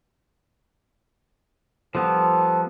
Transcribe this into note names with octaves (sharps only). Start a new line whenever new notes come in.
F3 G3 B3 A4 C5 A5